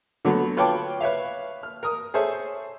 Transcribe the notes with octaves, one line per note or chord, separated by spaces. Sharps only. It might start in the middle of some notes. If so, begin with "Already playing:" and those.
D3 F#3 A3 B3
F4 B4 C#5 G5 A5 D6
B4 C#5 E5 F5
F6
A#4 D#6
G#4 A4 C5 C#5 E5